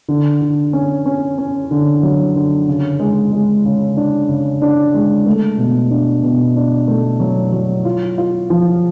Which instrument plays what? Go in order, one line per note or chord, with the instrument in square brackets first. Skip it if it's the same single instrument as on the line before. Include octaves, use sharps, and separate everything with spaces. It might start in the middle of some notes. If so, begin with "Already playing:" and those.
[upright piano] D3
D3
C#4
C#4
C#4
D3
F#3
D3
C#3
G#3
G#3
C#3
D4
C#3
D4
G#3
A3
B2
D4
B2
D4
A3
F#3
F#3
F4
F4
F3